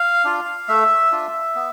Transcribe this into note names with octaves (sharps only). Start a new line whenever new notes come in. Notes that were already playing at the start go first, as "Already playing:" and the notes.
Already playing: F5
D4 F4
A3 E5
D4 F4
B3